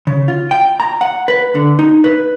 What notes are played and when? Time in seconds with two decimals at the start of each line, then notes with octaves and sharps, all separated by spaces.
0.07 C#3
0.28 F4
0.51 G5
0.80 A#5
1.01 F#5
1.28 B4
1.55 D3
1.79 D#4
2.04 B4